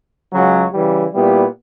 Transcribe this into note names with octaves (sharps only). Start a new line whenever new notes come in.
C#2 C#3 F#3
C#3 E3 G3
A#2 G3 B3 E4 G4